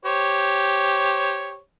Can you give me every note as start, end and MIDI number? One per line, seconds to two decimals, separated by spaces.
0.05 1.59 67
0.05 1.59 72
0.05 1.59 73